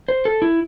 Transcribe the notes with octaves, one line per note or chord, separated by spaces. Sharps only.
C5
A4
E4